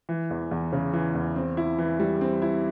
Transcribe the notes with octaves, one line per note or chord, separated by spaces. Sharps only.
E3
E2
E2
C#3
E3
E2
C4
E4
E3
G3
C4
E4